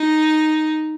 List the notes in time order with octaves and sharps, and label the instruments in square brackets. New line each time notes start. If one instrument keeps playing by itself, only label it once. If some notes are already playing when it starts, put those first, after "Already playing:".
Already playing: [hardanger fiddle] D#4